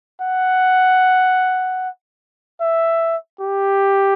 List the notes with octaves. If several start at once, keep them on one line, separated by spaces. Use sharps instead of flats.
F#5
E5
G4